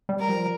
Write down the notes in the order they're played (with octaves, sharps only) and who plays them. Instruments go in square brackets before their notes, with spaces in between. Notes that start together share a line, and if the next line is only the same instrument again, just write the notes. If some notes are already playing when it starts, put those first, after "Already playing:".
[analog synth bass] G3
[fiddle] A#4
[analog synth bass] F3